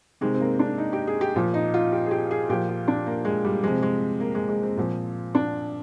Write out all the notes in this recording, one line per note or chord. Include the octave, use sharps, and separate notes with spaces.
C3 D#3 G#3
C4
A#3
D4
D#4
G4
G#4
G4
A#2 F3
D#4
F4
G4
G#4
G4
G#4
A#2 F3 G4
F4
D4
A#3
G#3
G3
C3 F3 G#3
G#3
A#3
G#3
G#3
C4
A#2 F3
D4